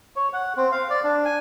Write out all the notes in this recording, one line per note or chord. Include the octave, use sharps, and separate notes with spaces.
C#5
F#5
C4
F5
D5
D4
G#5